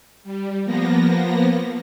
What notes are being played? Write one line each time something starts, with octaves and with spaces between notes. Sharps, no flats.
G3
F3 A#3 B3 A#6